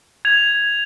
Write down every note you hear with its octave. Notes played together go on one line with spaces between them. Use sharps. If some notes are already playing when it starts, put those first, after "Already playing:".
G#6 F7